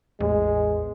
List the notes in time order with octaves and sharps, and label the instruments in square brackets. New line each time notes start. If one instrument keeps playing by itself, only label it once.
[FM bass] A1 [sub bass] E2 [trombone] G#3